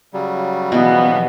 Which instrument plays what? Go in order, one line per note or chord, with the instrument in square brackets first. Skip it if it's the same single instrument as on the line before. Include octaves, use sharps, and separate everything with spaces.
[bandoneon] C#3 F#3 G3
[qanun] B2 E3 [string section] F3 B3